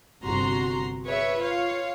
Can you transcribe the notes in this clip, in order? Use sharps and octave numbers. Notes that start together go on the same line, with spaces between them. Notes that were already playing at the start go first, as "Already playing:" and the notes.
G1 C3 F#4 A#5 C6
G#4 B4 C#5 E5
F4 C#5 F5